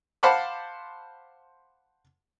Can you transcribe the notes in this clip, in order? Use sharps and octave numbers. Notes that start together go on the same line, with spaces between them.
C5 F5 F#5 A5 B5 D6